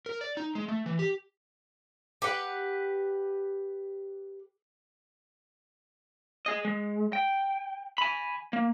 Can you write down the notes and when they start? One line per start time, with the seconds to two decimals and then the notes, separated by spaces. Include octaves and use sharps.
0.06 A#4
0.21 D5
0.37 D#4
0.55 G#3
0.68 A3
0.86 E3
0.99 G4
2.22 G4 B4 F#5
6.46 G#4 D#5
6.65 G#3
7.13 G5
7.98 G#5 B5
8.53 A#3